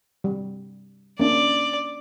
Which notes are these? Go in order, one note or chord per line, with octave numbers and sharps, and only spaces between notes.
G3
A#3 C#4 D4 D5